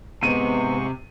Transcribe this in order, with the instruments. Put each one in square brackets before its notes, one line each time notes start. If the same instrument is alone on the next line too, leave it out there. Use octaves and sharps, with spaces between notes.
[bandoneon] G#2 G#3 C#6 [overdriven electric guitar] C3 [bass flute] B3 [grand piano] D#7